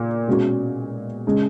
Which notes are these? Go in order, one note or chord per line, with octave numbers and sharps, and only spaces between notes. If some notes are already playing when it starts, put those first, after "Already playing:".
Already playing: A#2
B2 G#3 C#4 F#4
C#3 G#3